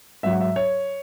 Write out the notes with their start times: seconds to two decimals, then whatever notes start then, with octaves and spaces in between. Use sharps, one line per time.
0.23 G#2 F#3 E5
0.32 F#5
0.41 E5
0.56 C#5